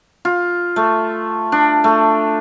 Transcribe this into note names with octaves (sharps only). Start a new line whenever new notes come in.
F4
A3
D4
A3